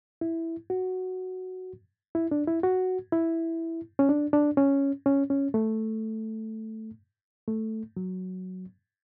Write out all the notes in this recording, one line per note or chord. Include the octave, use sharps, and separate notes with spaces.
E4
F#4
E4
D4
E4
F#4
E4
C#4
D4
D4
C#4
C#4
C#4
A3
A3
F#3